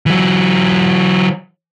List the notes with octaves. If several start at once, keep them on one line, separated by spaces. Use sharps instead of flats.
E3 F#3